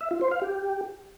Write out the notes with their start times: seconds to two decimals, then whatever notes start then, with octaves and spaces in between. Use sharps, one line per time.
0.01 E5
0.11 F4
0.21 C5
0.31 F5
0.42 G4